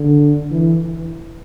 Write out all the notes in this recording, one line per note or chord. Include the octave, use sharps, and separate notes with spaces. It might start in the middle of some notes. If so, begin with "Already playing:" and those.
Already playing: D3
E3